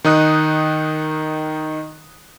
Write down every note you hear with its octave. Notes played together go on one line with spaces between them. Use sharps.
D#3 D#4 D#6 F#6